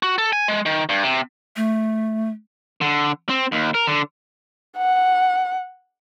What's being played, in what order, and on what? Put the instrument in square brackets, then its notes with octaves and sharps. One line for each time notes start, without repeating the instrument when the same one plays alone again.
[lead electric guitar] F#4
A4
G#5
G#3
D#3
G2
C3
[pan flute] A3
[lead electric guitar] D3
C4
D#2
A#4
D3
[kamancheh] F#5